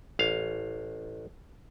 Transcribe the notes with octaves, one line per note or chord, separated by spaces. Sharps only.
A1 F5